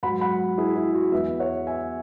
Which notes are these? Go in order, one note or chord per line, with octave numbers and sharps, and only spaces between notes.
G#2 F#3 F#5 B5
F#5 B5
E4 G#4
E4
F#4
E2 E3 B4 E5
C#5 F#5
E5 G#5